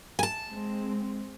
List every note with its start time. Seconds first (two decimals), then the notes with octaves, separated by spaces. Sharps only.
0.19 G#5 A5
0.50 G#3 C4